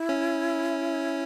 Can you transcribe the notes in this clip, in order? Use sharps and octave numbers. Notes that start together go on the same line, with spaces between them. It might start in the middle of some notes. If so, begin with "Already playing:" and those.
Already playing: E4
C#4